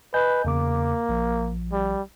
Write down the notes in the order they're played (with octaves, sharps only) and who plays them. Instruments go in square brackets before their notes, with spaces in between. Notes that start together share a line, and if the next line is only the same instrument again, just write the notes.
[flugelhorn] B4 [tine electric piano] D#5 G#5 G6
[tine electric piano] E2 C#3 D6 [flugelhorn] A#3
[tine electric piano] A#1 F3
[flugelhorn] G3